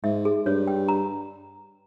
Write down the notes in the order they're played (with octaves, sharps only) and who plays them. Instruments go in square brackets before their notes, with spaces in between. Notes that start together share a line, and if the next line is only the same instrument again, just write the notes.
[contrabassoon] G#2 [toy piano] E5
[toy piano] G#4
[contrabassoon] G2 [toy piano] C#5
[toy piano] G5
A#5